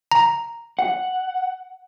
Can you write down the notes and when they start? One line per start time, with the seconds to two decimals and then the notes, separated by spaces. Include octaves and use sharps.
0.11 A#5
0.79 F#5